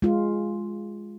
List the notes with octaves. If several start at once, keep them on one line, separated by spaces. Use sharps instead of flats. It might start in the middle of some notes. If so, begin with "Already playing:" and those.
G#3 F4